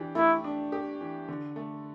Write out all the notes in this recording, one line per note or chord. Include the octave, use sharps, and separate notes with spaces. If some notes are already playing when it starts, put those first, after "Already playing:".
Already playing: E3 D4 G4
A3 E4
D4
G4
E3
D3
A3